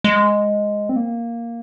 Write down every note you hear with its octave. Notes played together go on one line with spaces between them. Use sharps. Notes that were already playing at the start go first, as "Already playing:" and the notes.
G#3
C4
A#3